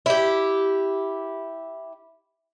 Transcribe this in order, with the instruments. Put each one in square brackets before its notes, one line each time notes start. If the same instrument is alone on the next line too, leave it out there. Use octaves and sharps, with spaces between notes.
[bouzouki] E4 G4